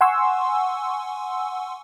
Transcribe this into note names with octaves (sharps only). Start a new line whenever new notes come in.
F#5 G#5 C6 C#6 E6